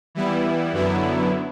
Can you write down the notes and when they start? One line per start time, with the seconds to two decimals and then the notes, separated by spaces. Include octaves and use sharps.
0.15 E3 G3 B3 E4
0.72 F#2 D3 F#3 B3 E4